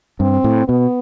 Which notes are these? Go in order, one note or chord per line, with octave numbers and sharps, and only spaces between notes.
G2 C4
A2
B2 B3